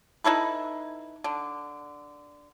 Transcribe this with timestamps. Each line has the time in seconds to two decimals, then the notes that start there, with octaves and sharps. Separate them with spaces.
0.24 D#4 E4 A4 B4
1.24 D3